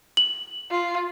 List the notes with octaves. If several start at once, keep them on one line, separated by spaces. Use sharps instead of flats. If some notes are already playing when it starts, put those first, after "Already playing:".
F#7
F4